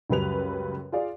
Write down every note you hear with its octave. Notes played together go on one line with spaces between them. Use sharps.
C#2 F#2 G3 B4 F7
F4 G#4 D5 F5